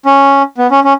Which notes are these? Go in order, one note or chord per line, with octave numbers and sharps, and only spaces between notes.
C#4
B3
C#4
C#4